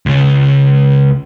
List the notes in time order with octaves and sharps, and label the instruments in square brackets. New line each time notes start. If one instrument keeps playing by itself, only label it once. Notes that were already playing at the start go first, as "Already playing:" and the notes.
[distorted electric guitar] C#2 C#3